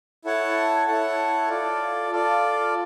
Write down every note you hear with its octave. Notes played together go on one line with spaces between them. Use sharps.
E4 A4 C#5 F#5 A5
E4 A4 C#5 F#5 A5
F4 A4 D5
F4 A4 D5